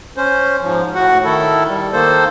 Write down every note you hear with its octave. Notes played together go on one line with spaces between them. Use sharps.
C#4 C5
G#2 F3
A2 F#4 F#5
D#3 E4 A4
G3
D#3 A#3 A4 C5